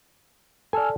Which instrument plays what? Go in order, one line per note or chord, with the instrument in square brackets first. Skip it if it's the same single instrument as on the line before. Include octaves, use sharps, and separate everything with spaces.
[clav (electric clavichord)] A4 D5 [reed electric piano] G#5 E6 F6